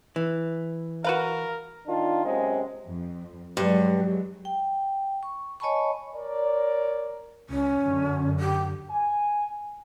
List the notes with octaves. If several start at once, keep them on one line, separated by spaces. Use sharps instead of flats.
E3
F#4 A#4 B4 F5
D#3 D4 F4
F#2 C3 G#3
F2
G2 F#3 G#3
G5
C#6
C#5 D#5 G#5 A5 B5 C#6
A#4 C#5 D5
C#2 C#4
F#2 D3
G4
G#5